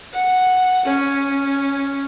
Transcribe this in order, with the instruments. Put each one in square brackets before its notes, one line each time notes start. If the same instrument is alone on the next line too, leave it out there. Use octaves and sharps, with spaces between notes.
[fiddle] F#5
C#4